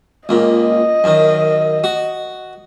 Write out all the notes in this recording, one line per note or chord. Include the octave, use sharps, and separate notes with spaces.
C#2 A#2 D#5
F#2 D#3
F#4